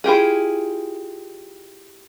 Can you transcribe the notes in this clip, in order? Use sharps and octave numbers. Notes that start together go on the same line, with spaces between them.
E4 F4 G4 G#4